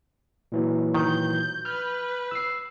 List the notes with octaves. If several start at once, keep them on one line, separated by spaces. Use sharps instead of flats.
A#2 E3 F#3
D#3 G6
B4 F6 G6
E6 C7